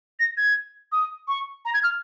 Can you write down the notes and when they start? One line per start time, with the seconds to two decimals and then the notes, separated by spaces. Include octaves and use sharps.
0.20 A#6
0.38 G#6
0.92 D#6
1.28 C#6
1.65 A#5
1.74 G#6
1.83 F6